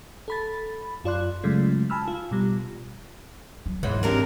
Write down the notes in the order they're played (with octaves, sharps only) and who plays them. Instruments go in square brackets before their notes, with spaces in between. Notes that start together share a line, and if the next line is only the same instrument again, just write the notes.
[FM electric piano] A4 B5 A6
F#2 F4 D5 C6 F#6
C#3 F#3 G#3 A3 F4
G#5 A5 B5 E6 F6
F4
B2 G3
[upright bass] F#3
[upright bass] D2 [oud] G#2 E3 F#3
[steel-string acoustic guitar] C4 D4 G4 [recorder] A#4